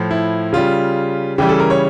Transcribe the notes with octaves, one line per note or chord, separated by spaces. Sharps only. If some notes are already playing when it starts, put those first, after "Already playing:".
Already playing: A2 F3
E4
C#3 G3 F4
C#3 E3 G3 G4
A4
A#4
C#5